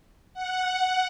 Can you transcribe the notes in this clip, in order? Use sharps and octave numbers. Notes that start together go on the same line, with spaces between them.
F#5